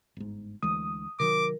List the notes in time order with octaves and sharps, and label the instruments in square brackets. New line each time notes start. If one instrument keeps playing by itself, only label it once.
[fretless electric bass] G1 G#2
[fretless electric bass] D2 E3 G#3 [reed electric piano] D#6
[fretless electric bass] C3 D#3 F#3 [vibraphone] A#4 [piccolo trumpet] D6